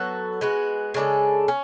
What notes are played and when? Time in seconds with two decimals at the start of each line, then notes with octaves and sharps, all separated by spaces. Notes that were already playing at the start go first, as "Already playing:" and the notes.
Already playing: F#3 B3 F#4 A4
0.41 G#3 B3 F#4
0.94 C#3 G#3 D4 A4
1.48 C#4